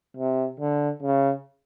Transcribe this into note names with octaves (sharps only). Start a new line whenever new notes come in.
C3
D3
C#3